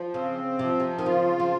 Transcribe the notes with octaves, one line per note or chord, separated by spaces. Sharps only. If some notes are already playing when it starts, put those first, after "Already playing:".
Already playing: F3
C#3 C4
C3 F3
C3
D#3
C#3 F4
F3